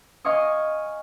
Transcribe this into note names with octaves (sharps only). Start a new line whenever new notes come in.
D#5 F5 G#5 C#6 D#6